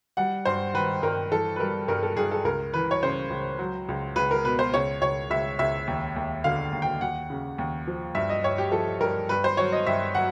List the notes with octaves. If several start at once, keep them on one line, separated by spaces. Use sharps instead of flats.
G3 F#5
G2 C5
D#3 B4
G2 A#4
E3 A4
B4
G3 A#4
G2 A#4
A4
G2 G#4
A4
C#2 A#4
E3 B4
C#5
C#3 C5
C#2
F#3
C#2
C#2 B4
A#4
B2 B4
C5
C#2 C#5
C#2 C#5
C#2 E5
C#2 E5
D#2
D#2
D3 F5
D#2
G5
D#2 F#5
C#3
D#2
F3
G2 E5
D#5
G2 C#5
G4
F3 A4
G2 A#4
G2 B4
C5
F#3 C#5
D#5
G2 E5
F#3 F#5